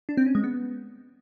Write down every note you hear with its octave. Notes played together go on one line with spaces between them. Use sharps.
D4
C4
C#4
G#3
B3